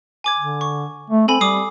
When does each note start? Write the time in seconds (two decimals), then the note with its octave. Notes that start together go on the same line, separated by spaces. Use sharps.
0.24 G#5 D6 G#6
0.38 D3
0.61 C#6
1.10 A3
1.28 C4 A4 G#5 B5
1.41 G3 D6 D#6 C7